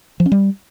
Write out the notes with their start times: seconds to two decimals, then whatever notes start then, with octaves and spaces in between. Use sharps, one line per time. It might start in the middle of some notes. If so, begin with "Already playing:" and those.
0.20 F3
0.26 C#4
0.32 G3